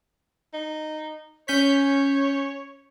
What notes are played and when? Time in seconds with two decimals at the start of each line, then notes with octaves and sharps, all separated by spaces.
0.54 D#4
1.48 C#4 C#5 G6 B6